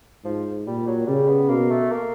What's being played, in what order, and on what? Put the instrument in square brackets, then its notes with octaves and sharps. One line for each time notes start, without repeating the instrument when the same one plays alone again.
[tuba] G#2 [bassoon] F3
[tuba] A#2 [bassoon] G3
[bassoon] F#3
[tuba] C#3 [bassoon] G3
[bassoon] B3
[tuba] B2 [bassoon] A#3
[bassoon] A3
A#3